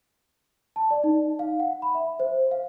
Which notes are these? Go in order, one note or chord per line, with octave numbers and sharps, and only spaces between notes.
A5
D5
D#4
F5
F#5
B5
E5
C5
F5